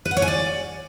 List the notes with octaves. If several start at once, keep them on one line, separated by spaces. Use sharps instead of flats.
B4
F#5
C#5
G#5
D5